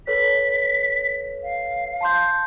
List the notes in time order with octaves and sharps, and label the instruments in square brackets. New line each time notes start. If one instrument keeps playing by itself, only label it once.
[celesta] A4 B4 C#5 [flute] B6
[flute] F5
[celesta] A5 C6 G6